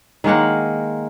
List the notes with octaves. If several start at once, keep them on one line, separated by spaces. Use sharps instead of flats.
D#3 G#3 A#3 F#5